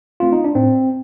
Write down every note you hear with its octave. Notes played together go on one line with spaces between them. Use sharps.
A3 C4 F4
D#4
D4
A2 C4